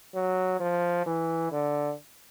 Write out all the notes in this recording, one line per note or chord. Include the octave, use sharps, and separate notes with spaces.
F#3
F3
E3
D3